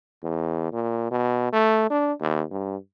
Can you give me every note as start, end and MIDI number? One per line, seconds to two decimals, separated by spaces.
0.23 0.68 40
0.73 1.07 46
1.11 1.52 47
1.52 1.87 57
1.90 2.12 62
2.21 2.43 39
2.51 2.76 43